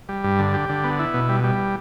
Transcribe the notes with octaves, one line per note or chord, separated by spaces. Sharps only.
G3
G2
D3
G4
D3
B3
E4
B2
G3
G3